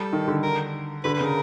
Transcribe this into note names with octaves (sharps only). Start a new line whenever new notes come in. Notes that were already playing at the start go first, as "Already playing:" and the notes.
Already playing: G3 A4
D#3
D3
A#4
D3 B4
B4
C#3
A#4